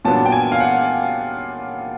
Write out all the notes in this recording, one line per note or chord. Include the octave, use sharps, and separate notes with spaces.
A#2 F#3 B3 D4 A5
G5
G#5
F5
F#5